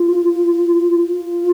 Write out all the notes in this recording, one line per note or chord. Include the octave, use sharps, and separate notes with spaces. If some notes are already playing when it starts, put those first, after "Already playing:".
Already playing: F4
F4